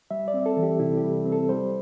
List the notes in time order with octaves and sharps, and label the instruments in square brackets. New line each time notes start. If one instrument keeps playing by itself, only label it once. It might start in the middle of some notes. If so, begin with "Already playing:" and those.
[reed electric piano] G3 E5
D5
C4
A4
E3
G4
C3 E4
G4
G3
C4
A4
G3 C5